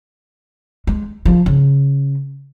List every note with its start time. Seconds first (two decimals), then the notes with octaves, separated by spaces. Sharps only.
0.87 G#3
1.25 F3
1.46 C#3